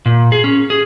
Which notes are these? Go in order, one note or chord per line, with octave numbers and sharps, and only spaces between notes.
A#2
G#4
C#4
G#4